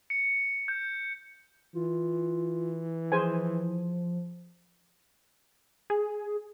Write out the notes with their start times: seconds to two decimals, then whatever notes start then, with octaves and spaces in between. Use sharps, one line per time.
0.10 C#7
0.68 G6
1.74 E3 F4
3.12 F3 G#4 C5 G#5
5.90 G#4